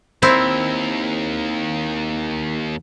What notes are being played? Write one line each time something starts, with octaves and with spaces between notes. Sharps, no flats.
D#2 C4 E4 A#4